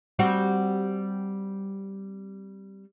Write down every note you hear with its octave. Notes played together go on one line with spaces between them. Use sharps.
G3 C4 F#4